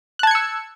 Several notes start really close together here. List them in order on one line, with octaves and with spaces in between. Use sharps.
F#6 A5 G#6 C#7 E6